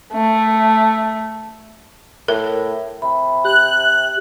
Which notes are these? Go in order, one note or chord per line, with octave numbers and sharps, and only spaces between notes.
A3
A2 A#4
C3 B5
G4 F#6